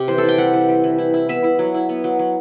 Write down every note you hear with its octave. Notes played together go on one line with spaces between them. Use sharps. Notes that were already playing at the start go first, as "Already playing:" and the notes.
Already playing: C3 G4
E3 C5
A4
E4
G5
G3 F#5
E3
G3
E3
E4
E4
B3 E5
E4
F#3
E4
B3
F#3
F#3